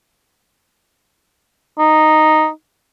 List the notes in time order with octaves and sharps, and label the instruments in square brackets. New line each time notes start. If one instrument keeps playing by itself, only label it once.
[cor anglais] D#4